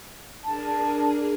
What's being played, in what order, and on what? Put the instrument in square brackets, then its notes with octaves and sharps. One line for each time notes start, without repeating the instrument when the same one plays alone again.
[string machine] D4 G#4 A#4 [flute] A5